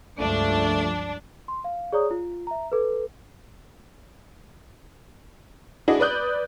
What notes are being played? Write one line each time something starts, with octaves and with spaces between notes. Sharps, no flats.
C#2 G2 F3 A3 D4
C6
F5
G#4 C#5 D5 A#5 D#6
F4
E5 A#5
A4 B4
D4 E4 F#4 G#4 D5 D#5
B4 D5 D#6 F#6 G6